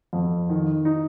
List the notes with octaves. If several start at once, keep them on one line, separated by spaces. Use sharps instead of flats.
F2
D#3
D#4